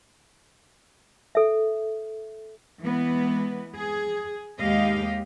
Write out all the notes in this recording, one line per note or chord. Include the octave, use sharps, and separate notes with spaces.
A4 E5
E3 G#3 B3
G#4
D#2 G#3 G4 D#5 F5